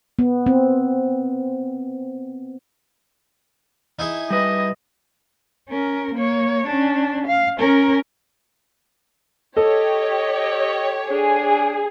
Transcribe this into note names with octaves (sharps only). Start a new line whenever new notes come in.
B3
C4
D#4 E4 G#4
G3 B4 D#5
C#4 A#4
A#3 C#5
C#4 D4
F5
C#4 A#4
G4 A4 C#5 D#5
D4 G#4